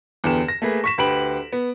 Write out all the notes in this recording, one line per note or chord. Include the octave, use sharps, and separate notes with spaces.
E2 D3 B3 G4 E7
A#6
A3 A#3 G#4 B4
C#6 B6 E7
D2 G4 B4 B5 D7 F#7
B3